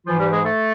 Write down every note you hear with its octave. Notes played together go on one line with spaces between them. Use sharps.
G#2 E3 F3 F4
G3 G4
G#3 G#4
A3 A4